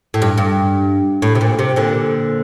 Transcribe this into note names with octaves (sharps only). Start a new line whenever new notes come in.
A2
G2
G2
A2
C3
A#2
C3
A#2 D3